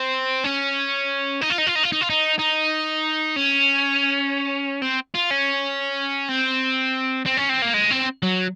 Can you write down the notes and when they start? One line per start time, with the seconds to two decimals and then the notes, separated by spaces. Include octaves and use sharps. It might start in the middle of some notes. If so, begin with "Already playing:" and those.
Already playing: C4
0.44 C#4
1.41 D#4
1.50 F4
1.58 D#4
1.67 F4
1.75 D#4
1.83 F4
1.92 D#4
2.01 F4
2.10 D#4
2.39 D#4
3.36 C#4
4.82 C4
5.14 F4
5.30 C#4
6.29 C4
7.26 C4
7.37 C#4
7.49 C4
7.62 A#3
7.74 G#3
7.91 C4
8.23 F#3